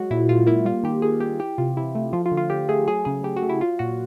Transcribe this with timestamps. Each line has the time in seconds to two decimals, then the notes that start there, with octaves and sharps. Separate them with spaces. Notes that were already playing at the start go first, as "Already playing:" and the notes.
Already playing: F#3 G#3 F#4
0.11 A#2 E4
0.29 A#2 F4
0.47 A#3 E4
0.65 G3 F4
0.83 D#3 G4
1.02 D#3 G#4
1.20 A#3 G4
1.39 E3 G4
1.58 C3 F4
1.77 C3 E4
1.95 A3
2.13 F3 F4
2.26 F4
2.32 D3
2.37 F4
2.50 D3 G4
2.69 A3 G#4
2.88 F#3 G#4
3.05 C#3 G#4
3.24 C#3 G4
3.37 F#4
3.42 A3
3.49 E4
3.61 F#3 F4
3.79 A#2 F#4